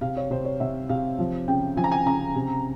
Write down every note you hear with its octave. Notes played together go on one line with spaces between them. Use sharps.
C3 F5
C#5
C3 C5
C#5
C3 E5
C3 F5
F3
C#3 G5
F3 G#5
A#5
G#5
C#3 A#5
C3